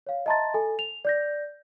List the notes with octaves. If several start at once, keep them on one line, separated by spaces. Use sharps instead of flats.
C#5 F5
D#5 E5 A5 A#5 C6 A6
A4 G#5
F7
D5 G6 A#6